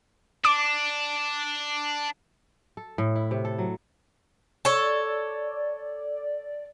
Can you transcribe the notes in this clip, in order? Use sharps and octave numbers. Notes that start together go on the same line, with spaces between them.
D4 D6
A4
A2
E4
C3
A4
F#3
A4 C#5 D5